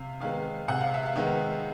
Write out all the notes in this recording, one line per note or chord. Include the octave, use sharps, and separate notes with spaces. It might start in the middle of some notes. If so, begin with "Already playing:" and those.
Already playing: C3 F5
D#3 G#3 B3 F5
C3 F#5
F5
E5
F5
D#3 G#3 B3